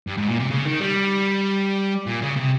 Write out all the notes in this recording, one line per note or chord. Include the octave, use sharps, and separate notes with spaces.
G2
G#2
A#2
C3
C#3
D#3
G3
A#2
C#3
C3